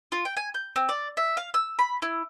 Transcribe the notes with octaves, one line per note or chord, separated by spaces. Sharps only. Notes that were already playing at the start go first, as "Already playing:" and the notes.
F4
G5
G#5
G6
C4
D5
E5
F5
E6
B5
E4